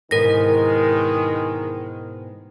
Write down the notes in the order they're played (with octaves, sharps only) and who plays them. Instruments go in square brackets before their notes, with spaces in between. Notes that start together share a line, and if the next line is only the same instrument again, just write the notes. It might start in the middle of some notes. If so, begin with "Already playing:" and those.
[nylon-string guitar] G#2 B2 E3 [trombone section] D#3 G#3 [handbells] A#4 A#6